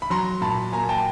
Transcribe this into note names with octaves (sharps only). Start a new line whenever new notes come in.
B5
F#3 A#5 C6
A#2 A5 B5
A#3 G#5 A#5
G5 A5